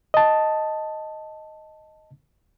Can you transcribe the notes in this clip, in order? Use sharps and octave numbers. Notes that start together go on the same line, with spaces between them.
D#5 A5